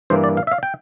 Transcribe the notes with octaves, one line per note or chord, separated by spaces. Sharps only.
G2 E3 A#3 C5
D5
F5
E5
F5
G5